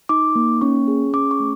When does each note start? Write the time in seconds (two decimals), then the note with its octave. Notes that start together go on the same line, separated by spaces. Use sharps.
0.09 D#4 D6
0.35 A#3
0.61 C#4 C#6
0.88 G#4
1.14 C#4 D6
1.31 C#6
1.40 A3